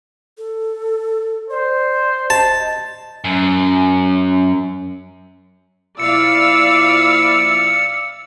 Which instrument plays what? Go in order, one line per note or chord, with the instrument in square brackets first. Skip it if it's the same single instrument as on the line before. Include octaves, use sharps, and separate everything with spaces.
[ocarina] A4
[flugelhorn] C5 [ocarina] D5
[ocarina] D#5 [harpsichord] A5
[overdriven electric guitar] F#2
[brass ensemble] A#2 F3 E4 [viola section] D5 F5 [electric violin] E6 [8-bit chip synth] C#7